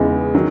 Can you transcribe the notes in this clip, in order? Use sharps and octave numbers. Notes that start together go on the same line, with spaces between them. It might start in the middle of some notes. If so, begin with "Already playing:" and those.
Already playing: E2 C#3 G#3 B3 D#4
D#3 F#3